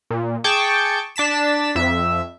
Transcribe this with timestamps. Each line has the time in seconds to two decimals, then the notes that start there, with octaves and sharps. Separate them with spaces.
0.11 A#2
0.44 G#4 G5 A5 C#6 D6
1.16 D4 A5 B6 E7
1.75 F2 E5